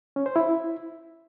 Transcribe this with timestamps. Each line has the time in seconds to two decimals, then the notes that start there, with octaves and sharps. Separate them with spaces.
0.16 C#4
0.26 C5
0.36 E4